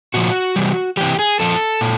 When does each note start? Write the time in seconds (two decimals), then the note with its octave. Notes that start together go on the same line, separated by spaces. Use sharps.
0.14 A#2 F3 F#4
0.56 C3 E3 G3
0.97 C3 E3 G3 G4
1.19 G#4
1.40 A#2 F3 A4
1.81 A#2